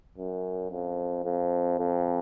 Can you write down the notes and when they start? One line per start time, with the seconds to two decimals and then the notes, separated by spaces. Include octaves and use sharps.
0.17 F#2
0.71 F2
1.24 F2
1.79 F2